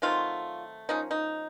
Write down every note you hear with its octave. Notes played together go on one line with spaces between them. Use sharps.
D#3 F#3 A3 C4 F4
F3 A#3 C#4 D#4
D#4